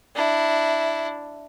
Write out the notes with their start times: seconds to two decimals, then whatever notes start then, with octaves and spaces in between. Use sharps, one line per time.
0.16 D4 E4